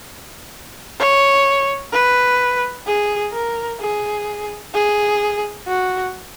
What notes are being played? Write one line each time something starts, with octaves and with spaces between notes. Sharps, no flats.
C#5
B4
G#4
A#4
G#4
G#4
F#4